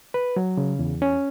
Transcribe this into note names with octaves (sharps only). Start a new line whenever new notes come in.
B4
F#3
C#3
E2
C#4